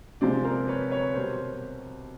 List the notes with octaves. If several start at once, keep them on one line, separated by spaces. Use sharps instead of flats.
C3 F3 G#3 C5 D5
A#4 C5
B4 C#5
B4 C#5
B2 G3 A#4 C5